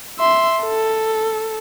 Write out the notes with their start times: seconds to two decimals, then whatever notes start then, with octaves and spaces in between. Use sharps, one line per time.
0.19 E5 C6
0.62 A4